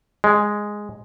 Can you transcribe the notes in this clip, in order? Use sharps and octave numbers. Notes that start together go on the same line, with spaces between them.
G#3